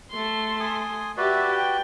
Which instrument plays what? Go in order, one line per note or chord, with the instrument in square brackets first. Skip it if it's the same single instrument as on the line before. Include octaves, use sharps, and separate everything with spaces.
[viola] A3 C6
[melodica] G#5 D#6
[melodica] F#4 B4 D5 [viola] G4 E5
[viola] G5